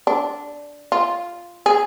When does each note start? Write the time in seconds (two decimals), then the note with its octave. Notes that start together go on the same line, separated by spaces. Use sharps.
0.07 D4
0.92 F4
1.66 G#4